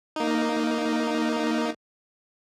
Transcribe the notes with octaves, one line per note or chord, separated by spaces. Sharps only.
A#3 D#4